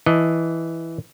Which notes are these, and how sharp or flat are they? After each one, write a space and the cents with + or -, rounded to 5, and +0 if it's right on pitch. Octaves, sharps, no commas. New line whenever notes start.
E3 +0 D#5 +0 A5 +0